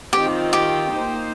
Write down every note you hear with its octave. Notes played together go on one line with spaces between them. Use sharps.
D#3 C4 F4 G4
G4
A#3 D#4 C5